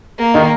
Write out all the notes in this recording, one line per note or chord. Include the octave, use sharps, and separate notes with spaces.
A#3
D#3 D#4